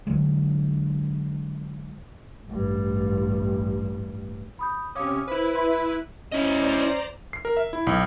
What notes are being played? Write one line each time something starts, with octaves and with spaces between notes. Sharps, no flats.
D3 D#3 F#3 G#3
A1 G2
B5 D#6 G6
C3 C#4 F5 D6 D#6
E4 B4 C5
E5 B5 C6
C#4 E4 C5 D5 D#5 A#5
C7
A#4
E5
E4
B1